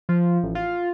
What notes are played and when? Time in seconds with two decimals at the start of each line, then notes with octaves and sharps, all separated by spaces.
0.09 F3
0.43 A1
0.55 F4